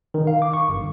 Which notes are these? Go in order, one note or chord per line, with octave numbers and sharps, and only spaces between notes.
D#3
F5
D6
C#6
G1